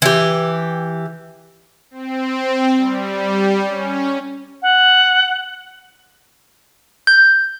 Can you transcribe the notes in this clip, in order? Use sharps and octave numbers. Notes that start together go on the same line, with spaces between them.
E3 G4
C4
G3
C#4
F#5
G6